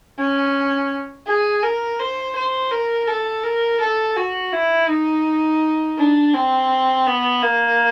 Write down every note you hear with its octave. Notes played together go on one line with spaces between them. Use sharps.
C#4
G#4
A#4
C5
C5
A#4
A4
A#4
A4
F#4
E4
D#4
D4
C4
B3
A#3